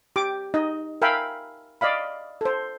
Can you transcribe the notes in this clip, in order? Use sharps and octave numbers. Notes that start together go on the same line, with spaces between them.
G4 D6
D#4 D#5
A#4 E5 F5 G5 G#5 B5
D5 D#5 F5 B5
A4 C5